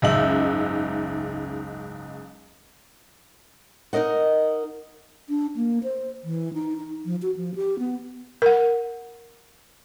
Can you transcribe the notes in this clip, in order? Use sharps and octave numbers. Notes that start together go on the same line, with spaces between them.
F#1 C#2 G#2 D#4 E5 F#7
D#4 A#4 D#5 F#5
D4
A#3
C5
E3
D#4
D#4
F3
F#4
F3
G4
B3
A#4 F#5